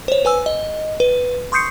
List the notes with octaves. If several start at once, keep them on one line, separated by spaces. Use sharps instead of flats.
C5 C#5
B4 G#5 E6
D#5
B4
C6 C#6 D#6 G6 C7 C#7